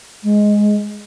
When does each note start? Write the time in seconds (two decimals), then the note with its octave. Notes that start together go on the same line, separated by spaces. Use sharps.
0.23 G#3